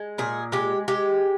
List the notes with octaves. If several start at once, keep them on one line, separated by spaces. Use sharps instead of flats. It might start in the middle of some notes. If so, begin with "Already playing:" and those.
Already playing: G#3
A#2 G#4
G#3 G4
G#3 G4